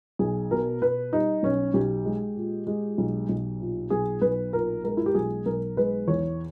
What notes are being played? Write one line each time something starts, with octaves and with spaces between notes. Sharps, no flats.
B1 G#4
B2 A#4
B2 B4
G3 D#4
B1 C#4
B1 G4
G#3
A#2
G#3
B1
B1
A#2
B1 G#4
B1 B4
A#2 A#4
G#3 A#4
E4
G4
B1 G#4
B1 A#4
G#3 B4
E2 C#5